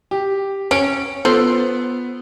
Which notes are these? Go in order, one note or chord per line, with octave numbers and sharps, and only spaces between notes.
G4
C#4 D7
B3 F4 A4 C5